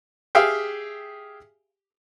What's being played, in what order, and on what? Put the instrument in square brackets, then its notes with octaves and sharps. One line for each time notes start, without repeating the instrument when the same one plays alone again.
[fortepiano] G4 G#4 E5 F5 G5